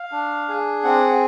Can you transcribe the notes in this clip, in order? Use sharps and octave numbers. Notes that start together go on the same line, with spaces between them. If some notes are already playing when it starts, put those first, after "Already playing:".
Already playing: F5
D4
G#4
C4 F#5